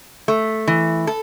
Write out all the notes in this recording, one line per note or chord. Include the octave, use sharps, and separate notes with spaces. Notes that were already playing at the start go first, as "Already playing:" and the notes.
A3
E3
A4